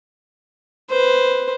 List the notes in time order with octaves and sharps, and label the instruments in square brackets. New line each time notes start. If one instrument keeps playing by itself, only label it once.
[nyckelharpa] B4 C5